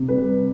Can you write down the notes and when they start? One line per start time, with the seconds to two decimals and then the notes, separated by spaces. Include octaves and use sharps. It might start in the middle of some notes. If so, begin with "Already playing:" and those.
Already playing: C3
0.08 G3 B4